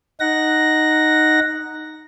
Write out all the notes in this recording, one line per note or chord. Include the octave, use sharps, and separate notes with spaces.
D#4 F#5 A#6